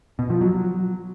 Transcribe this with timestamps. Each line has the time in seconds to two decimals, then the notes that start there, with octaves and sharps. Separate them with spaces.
0.19 B2
0.30 F3
0.41 F#3